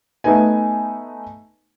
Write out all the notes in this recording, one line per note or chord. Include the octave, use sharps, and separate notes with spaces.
A3 B3 D#4 B4 G#5